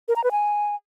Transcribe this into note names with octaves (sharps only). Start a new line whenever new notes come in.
A#4
A#5
B4
G#5